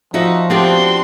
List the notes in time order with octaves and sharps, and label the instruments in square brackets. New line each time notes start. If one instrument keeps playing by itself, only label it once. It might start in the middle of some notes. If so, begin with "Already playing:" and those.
[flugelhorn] F3 [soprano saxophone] D#4 [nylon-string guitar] F#4 D#5 E5
[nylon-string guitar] B3 D4 G4 [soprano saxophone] C4 [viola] F#4 C6